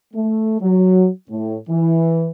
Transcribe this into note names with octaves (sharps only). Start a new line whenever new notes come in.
A3
F#3
A2
E3